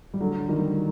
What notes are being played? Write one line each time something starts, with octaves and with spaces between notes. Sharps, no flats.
G3
D3 F#3
D#3 G3